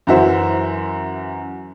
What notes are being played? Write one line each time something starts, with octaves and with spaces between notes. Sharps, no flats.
F#2 E3 F#4 C5 E5